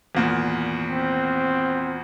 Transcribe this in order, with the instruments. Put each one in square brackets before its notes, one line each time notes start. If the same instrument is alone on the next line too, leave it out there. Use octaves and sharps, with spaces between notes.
[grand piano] G#1 E2 A#2
[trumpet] C4